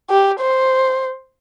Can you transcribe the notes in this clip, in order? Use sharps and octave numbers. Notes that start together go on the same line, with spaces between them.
G4
C5